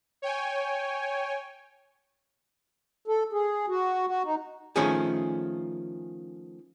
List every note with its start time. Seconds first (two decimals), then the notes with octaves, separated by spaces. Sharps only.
0.22 C#5 G5 G#5
3.08 A4
3.33 G#4
3.68 F#4
4.07 F#4
4.24 D#4
4.76 D#3 F3 A3 C#4 G#4